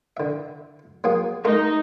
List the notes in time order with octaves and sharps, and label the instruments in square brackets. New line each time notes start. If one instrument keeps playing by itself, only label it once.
[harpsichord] D3 E5
F#3 A#3 G#4
[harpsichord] G#3 A3 A#4 [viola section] D#4